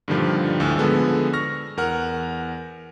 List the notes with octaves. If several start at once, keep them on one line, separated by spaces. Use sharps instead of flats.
G2 A#2 D3 D#3 F3 G3
D2 A2 E6
D3 F3 G#3 B3 A4
C#6 F6 A#6
E2 A#4 F#5 F6